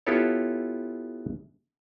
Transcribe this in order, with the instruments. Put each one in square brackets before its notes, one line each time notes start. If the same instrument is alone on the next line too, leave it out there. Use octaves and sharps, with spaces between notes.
[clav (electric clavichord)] B3 E4 F4 G4 A4 C#5